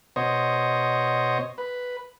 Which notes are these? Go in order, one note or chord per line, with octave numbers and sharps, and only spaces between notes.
B2 C5 C#5 D#5
B4